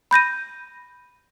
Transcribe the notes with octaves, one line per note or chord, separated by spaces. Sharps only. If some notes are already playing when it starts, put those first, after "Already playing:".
B5 G6 A#6 D#7